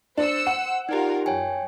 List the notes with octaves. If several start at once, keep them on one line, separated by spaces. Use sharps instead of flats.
D4 C5 E6 C#7
F#5
D#4 F4 G4 A#4 D5
F#2 C#5 G5 G#5